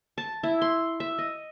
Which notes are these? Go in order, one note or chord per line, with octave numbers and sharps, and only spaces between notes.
A5
E4
C6
E5
D#5